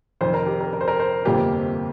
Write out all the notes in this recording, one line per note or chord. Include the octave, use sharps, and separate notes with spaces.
F1 F2 D#3 C5
A#4
G4
A#4
A#4
C5
A#4
C5
G1 F2 C3 F3 A#3 G4